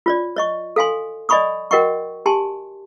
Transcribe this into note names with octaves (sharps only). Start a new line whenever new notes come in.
F4 C#5 D5
C#5 D#5 C#6
A4 F5 G#5 C6
D5 D#5 G#5 B5 C#6 D#6
F#4 A#4 D#5 F#5 G5 C#6
G4 G#5 A5 C6